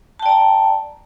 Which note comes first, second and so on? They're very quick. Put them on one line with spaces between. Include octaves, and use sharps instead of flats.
A5 G5 D5 A#5